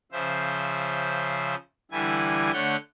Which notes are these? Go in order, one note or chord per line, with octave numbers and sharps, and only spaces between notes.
C#3 F3 C5 E5
D3 E3 G3 E4 G#5
D3 A3 C#5 F#5 G6